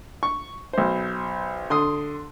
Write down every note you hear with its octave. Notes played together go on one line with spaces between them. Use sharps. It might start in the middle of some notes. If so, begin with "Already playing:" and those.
C#6
B1 C5
D3 C6 D#6